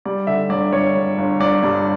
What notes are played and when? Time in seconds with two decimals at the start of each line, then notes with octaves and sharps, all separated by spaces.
0.05 G3 D5
0.27 D3 E5
0.49 G1 D5
0.73 G1 C#5
0.95 G1
1.18 G1
1.40 G1 D5
1.63 G2